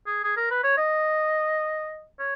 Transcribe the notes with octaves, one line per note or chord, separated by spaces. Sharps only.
G#4
G#4
A#4
B4
C#5
D#5
C#5